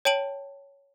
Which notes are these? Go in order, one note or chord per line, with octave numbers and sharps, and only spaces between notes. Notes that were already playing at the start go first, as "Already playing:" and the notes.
C#5 G5 A5 D7 F#7